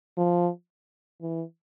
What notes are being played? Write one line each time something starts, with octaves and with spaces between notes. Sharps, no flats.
F3
E3